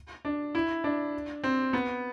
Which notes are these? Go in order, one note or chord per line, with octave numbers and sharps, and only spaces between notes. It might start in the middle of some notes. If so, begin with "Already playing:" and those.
D4
E4
D4
C4
B3